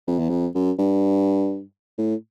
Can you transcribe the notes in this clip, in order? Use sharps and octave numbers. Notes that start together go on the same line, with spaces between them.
F2
E2
F2
F#2
G2
A2